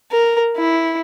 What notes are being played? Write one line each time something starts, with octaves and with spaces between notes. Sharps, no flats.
A#4
E4